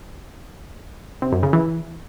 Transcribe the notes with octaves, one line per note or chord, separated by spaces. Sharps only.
C3
F#2
C#3
E3